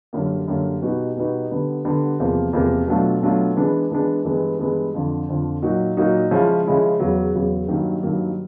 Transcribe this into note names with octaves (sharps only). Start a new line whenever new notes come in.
F#2 D3 G3 A#3
F#2 D3 G3 A#3
B2 G3 B3 D#4 F#4
B2 G3 B3 D#4 F#4
D3 G3 B3
D3 G3 B3
E2 C3 F3 A#3
E2 C3 F3 A#3
B2 F#3 A3 D4 F4
B2 F#3 A3 D4 F4
E3 G#3 B3 D4
E3 G#3 B3 D4
G2 E3 G#3 B3
G2 E3 G#3 B3
F2 D3 F3
F2 D3 F3
A#2 F#3 A#3 D#4 F#4
A#2 F#3 A#3 D#4 F#4
C#3 F3 G#3 C#4 E4
C#3 F3 G#3 C#4 E4
E2 C#3 F#3
E2 C#3 F#3
G2 D#3 F#3 A#3
G2 D#3 F#3 A#3